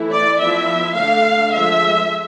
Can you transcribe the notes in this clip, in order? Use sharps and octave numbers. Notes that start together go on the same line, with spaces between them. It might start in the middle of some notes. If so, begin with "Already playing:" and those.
Already playing: E3 A3 E4
D5
F3 B3 E4 E5
D3 A3 D4 F5
D3 F3 G#3 E5